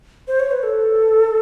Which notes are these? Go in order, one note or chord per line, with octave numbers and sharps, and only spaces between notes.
C5
C#5
B4
A4